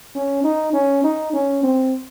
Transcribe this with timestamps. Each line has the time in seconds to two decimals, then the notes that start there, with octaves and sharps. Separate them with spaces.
0.15 C#4
0.44 D#4
0.74 C#4
1.04 D#4
1.33 C#4
1.63 C4